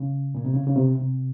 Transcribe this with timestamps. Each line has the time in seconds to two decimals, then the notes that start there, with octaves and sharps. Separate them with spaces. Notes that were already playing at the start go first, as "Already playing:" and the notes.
Already playing: C#3
0.35 A#2
0.45 C3
0.54 C#3
0.66 C#3
0.76 C3
1.00 C3